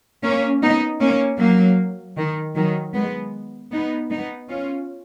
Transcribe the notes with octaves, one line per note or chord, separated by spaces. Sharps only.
A#3 C#4
B3 D#4
A#3 C#4
F#3 A#3
D#3
D#3 F#3
G#3 B3
B3 D#4
B3 D#4
C#4 F4